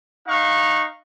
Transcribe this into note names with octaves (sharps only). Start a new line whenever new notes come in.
D#4 F5 F#5 C#6